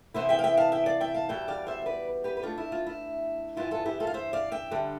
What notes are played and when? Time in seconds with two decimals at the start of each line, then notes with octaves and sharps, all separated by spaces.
0.14 C3 E3 B3 E4 C5 E5
0.29 E5 G5
0.39 F5
0.44 E5 G5
0.57 F5 A5
0.72 E5 G5
0.86 D5 F5
1.00 E5 G5
1.14 F5 A5
1.29 E2 B2 G3 E5 G5
1.48 D5 F5
1.67 C5 E5
1.82 E5
1.86 B4 D5
2.24 G4 B4
2.37 B4
2.43 B2 A3 D4 F4 A4
2.58 E4
2.72 F4
2.87 E4
3.57 G2 E3 B3 E4 F4
3.71 F4 A4
3.86 E4 G4
4.00 F4 A4
4.07 F5
4.14 C5 E5
4.33 D5 F5
4.52 E5 G5
4.71 D3 G3 D4